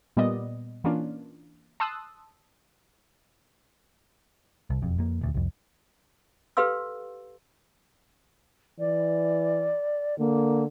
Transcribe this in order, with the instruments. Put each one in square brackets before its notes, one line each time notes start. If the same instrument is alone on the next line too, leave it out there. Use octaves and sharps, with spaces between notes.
[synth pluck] A#2 G3 B3 D5 D#5
E3 A#3 C#4 D4 F4
A5 C6 D#6 E6 F#6
[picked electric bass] C2
E1 F2
F2 A#3
D#1 D2
C2 F2
[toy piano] G4 A4 B4 F5 C6 E6
[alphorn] E3 [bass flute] D5
[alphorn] D3 [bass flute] A#3